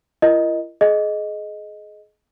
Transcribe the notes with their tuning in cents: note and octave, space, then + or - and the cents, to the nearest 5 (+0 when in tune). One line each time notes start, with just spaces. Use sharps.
E4 +45 A#4 +0 D#5 +0
G#4 +30 D#5 +0